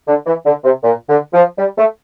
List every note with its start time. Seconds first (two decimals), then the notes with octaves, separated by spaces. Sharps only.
0.08 D3
0.26 E3
0.46 D3
0.64 C3
0.83 A#2
1.08 D3
1.34 F3
1.58 G3
1.78 A3